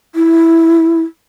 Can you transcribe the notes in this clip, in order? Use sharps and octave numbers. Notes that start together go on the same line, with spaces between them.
E4